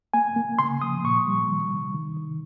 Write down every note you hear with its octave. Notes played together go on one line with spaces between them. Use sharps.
A#3 G#5
A#3
C#3 C6
F3 D#6
A#2 C#6
G3
D#3
C3
D#3
D#3